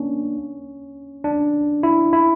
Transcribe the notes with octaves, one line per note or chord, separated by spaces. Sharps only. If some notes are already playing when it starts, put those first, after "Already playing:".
Already playing: A#3 C#4 D4
D4
E4
E4